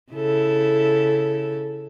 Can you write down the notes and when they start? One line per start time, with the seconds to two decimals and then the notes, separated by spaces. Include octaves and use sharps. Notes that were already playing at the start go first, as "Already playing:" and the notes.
0.13 C#3 E4 A4